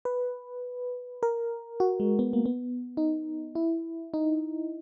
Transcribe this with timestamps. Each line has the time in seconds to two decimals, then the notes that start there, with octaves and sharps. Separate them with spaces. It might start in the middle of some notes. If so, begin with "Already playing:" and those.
0.05 B4
1.23 A#4
1.80 F#4
2.00 G#3
2.19 B3
2.33 A#3
2.46 B3
2.97 D#4
3.55 E4
4.14 D#4